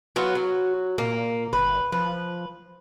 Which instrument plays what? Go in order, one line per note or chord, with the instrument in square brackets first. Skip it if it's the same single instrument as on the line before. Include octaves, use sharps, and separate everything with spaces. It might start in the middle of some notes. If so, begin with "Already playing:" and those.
[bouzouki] F#3 B3 F4 [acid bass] F#4
[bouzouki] F#3
[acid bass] A#2 [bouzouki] A#3
[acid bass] G1 [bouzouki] B4
[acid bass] F3 [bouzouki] B4